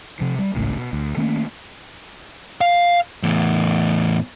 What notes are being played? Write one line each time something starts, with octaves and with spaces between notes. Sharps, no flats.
C3 F3
G3
G#1 C#2 A2 C#3
B2
D2
D#3 A3 A#3 C#4
F5
E2 A2